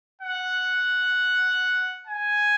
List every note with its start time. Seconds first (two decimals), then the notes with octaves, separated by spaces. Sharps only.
0.21 F#5
2.07 G#5